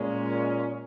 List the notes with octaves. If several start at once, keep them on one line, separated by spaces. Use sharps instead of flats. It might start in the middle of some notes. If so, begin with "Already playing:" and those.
Already playing: A#2 G#3 C#4